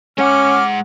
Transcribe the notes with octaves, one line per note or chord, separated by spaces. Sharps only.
G#3 C#4 F#5 D6 F6